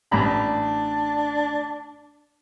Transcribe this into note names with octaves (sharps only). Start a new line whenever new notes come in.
A1 D4 A#5 B5